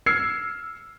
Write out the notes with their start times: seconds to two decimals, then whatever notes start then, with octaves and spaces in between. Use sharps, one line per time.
0.06 E6 F6 G#6 C7 C#7